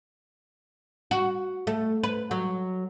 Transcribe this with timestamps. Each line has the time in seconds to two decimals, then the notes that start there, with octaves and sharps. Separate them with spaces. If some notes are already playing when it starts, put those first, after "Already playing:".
1.11 F#4
1.67 A3
2.03 B4
2.31 F#3